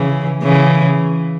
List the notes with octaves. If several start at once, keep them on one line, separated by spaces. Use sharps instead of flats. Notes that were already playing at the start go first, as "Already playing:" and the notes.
Already playing: C#3 E3
C#3 E3